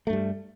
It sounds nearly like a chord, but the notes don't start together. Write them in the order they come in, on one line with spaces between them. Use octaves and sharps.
A3 G2 G3